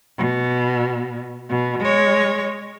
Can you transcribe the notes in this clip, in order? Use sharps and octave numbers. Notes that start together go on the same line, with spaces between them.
B2
B2
G#3 C#5